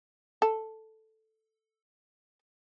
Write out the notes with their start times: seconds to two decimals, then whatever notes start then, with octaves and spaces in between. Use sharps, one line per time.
0.42 A4